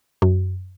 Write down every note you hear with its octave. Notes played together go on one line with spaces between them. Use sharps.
F#2